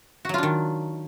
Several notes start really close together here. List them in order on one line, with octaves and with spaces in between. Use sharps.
F#4 F#3 F4 D4 D#3